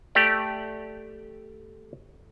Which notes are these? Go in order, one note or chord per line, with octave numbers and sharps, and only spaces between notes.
A3 G4 D5